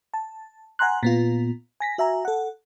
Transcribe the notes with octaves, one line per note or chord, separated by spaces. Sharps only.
A5
F#5 G#5 A#5 C6 F#6
A#2 B3 F4
G#5 A#6 B6
F#4 E5 G#5 A#5
A4 F#5